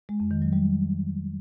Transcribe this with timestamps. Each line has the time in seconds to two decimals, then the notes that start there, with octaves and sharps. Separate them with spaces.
0.09 G#3
0.20 F2
0.31 D#3
0.42 F#3
0.53 G3